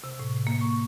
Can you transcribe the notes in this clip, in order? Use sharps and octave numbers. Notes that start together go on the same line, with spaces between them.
C3
A2
A#3
C#6